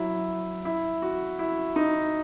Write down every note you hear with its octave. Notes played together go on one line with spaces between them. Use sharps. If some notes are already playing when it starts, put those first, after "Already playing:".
Already playing: F#3 E4
E4
F#4
E4
D#4